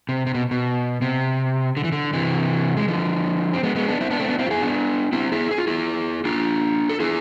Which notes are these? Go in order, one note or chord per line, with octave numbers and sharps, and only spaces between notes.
C3
C3
B2
B2
C3
D3
E3
D3
C3 E3
G#3
D3 F3
C4
G#3 B3
G#3 B3
B3 D4
C4 E4
B3 D4
A3 C4
B3 D4
C4 E4
F4
E4 G#4
B3 D4
C4 E4
E4 G#4
G#4
F4
E4 G#4
D4 F4
A4
E4 G#4